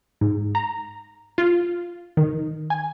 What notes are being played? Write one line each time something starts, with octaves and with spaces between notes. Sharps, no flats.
G#2
A#5
F4
D#3
G#5